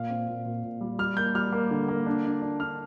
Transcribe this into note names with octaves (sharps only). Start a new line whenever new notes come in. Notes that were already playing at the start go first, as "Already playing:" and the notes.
Already playing: A#2 F5
C4
A#2
A#2
A#2
G3
G3 F6
A#3 G6
G3 F6
A#3
D3
A#3
D4
D4
D4
D4 F6